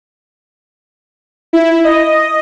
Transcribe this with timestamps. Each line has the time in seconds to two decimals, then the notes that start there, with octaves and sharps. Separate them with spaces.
1.53 E4
1.84 D#5